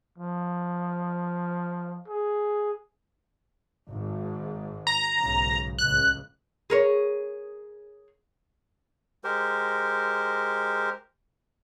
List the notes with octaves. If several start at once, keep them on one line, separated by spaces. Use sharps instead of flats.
F3
G#4
G#1 G#2
A#5
B1 G#2 C#3
C#2 A2 F#6
G#4 A#4 C#5
G#3 G4 A#4 C5